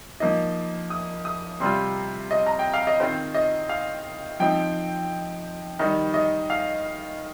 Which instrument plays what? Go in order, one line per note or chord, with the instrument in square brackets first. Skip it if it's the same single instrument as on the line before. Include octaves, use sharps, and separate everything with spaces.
[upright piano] F3 A#3 D#4 D#5
D#6
D#6
C3 G3 C4 F4 C6
D#5
A#5
G5
F5
D#5
D#3 C4 F4 C5
D#5
F5
F3 C4 D#4 G5
D#3 G3 D#4 D#5
D#5
F5